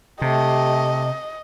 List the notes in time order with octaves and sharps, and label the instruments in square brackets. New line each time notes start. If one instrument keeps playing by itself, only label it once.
[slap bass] C3 [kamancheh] A3 G4 [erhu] D#5